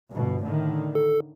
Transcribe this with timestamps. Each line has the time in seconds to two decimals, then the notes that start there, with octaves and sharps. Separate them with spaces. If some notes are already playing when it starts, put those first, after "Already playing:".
0.10 G1 B2
0.43 A2 D3 D#3
0.95 A4